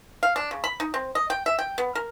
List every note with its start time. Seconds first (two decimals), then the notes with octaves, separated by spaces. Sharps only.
0.23 F5
0.36 D4
0.51 C#3
0.64 B5
0.80 D#4
0.94 C4
1.15 D#5
1.30 G5
1.46 E5
1.59 G5
1.78 B3
1.95 A#4